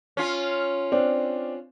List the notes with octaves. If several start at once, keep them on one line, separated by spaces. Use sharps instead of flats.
C#4 F4
C4 D4